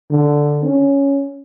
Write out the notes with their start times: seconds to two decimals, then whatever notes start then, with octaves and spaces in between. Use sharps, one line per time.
0.11 D3
0.65 C#4